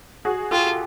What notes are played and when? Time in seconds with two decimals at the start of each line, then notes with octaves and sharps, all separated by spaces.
0.25 F#4 G#4
0.51 F4 G4 A4